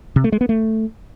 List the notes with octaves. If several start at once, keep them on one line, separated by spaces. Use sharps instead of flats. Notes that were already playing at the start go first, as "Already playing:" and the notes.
C3
A3
G#3
B3
A3